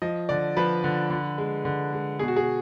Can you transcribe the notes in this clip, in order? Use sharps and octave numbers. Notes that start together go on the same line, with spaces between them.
F3 D#5
D3 D5
F3 B4
D3
D3
G#3
D3
G#3
B2 G#4
F#4
G#4